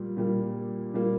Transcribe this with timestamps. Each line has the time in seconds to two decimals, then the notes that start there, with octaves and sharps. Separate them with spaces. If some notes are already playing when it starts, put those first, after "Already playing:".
Already playing: A#2 G3 A#3
0.17 A#2 G3 A#3
0.94 A#2 G3 A#3